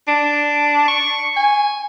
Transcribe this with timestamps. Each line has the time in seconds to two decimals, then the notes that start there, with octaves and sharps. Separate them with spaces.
0.08 D4
0.88 C#6
1.36 G#5